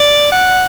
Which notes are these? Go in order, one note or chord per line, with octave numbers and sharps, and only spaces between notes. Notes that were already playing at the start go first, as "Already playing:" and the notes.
Already playing: D5
F#5